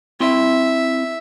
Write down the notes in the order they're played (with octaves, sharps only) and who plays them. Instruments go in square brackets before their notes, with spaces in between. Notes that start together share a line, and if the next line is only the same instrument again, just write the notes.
[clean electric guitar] C4 E4 C6 [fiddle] E5